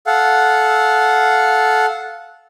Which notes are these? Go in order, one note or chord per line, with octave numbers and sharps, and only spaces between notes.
A4 F5 F#5